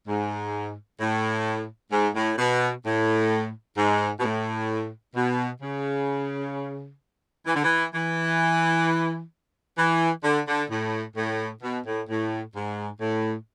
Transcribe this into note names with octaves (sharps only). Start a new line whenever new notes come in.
G#2
A2
G#2
A2
B2
A2
G#2
B2
A2
B2
C#3
E3
D3
E3
E3
E3
D3
D3
A2
A2
B2
A2
A2
G#2
A2